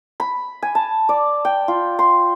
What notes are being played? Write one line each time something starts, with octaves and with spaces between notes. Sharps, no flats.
B5
G#5
A5
D5
G5
F4
C6